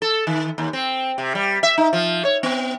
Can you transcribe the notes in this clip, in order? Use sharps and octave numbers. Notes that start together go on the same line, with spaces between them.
A4
D#3
D#2
C4
C3
G3
E5
D#4
F3
C#5
B3